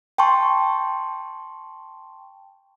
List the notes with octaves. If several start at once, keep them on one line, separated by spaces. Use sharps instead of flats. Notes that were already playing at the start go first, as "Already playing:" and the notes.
G5 A5 C6 C#6